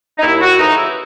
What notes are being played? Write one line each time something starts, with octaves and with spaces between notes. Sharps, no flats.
D#4
D#2 E4
F#4
C#3 E3 A3 D#4
E4